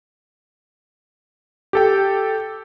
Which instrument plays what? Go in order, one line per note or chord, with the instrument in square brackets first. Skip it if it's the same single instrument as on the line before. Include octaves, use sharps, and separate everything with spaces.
[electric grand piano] G4 A4 G5